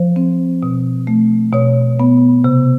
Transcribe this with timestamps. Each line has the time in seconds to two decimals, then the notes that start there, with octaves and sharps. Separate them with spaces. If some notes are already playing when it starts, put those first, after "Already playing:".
Already playing: F3 C5
0.16 C4
0.63 B2
1.07 A3
1.53 B2 C#5
2.00 B3
2.44 C3